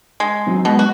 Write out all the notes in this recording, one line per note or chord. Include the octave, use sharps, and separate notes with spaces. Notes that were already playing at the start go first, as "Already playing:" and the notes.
G#3
F#3 C4 D#4
B2 G#3 B3
F#4